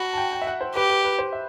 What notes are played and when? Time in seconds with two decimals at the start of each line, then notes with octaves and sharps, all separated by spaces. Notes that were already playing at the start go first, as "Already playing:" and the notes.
Already playing: F#4 A5 B5
0.13 A5
0.18 G5
0.32 G5
0.42 E5
0.47 F#5
0.61 C5
0.75 G4 B4
0.90 B4
1.04 B4
1.19 C5
1.33 E5